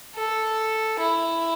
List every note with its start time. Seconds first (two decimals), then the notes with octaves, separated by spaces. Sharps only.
0.15 A4
0.99 E4